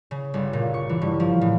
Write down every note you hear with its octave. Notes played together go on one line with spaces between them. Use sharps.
C#3
G1
A#2
C#6
E3
G2
F3
A2